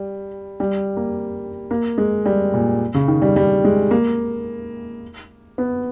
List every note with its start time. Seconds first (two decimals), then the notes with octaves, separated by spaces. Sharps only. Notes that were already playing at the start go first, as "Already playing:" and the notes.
Already playing: G3
0.60 G3
0.97 A#3
1.71 A#3
1.98 G#3
2.26 G3
2.54 A#2
2.94 C#3
3.08 D#3
3.22 G3
3.36 G3
3.64 G#3
3.91 A#3
5.58 B3